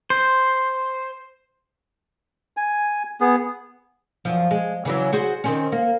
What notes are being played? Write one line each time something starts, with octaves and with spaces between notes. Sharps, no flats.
C5
G#5
B3 G#4
F#2 F3
G#3
C#3 E3 F#3
F#4 G#4 C5
D#3 C4 C#4
A#3